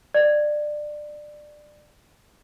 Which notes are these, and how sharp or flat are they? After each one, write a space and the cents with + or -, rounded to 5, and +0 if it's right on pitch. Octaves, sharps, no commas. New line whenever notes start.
D5 +20